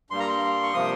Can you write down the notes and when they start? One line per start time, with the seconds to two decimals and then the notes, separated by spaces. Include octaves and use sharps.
0.10 G2 G3 A#3 C6
0.20 A#5
0.28 C6
0.63 C#6
0.74 C3 F3 A#3 D#6